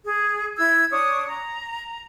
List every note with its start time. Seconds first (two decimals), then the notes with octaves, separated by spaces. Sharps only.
0.04 G#4
0.58 E4 E6 G#6
0.91 D4 C#5 D#6
1.28 A#5